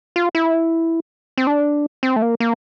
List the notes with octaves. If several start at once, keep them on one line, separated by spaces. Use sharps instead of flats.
F4
E4
C4
D4
C4
A3
A#3
A#3